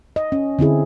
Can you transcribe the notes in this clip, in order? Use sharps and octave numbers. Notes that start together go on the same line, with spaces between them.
D#5
C#4
D3 C4 E4 G#4